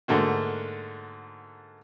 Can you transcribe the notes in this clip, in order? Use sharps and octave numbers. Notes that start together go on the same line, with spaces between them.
G#2 D3 A3 A#3 F#4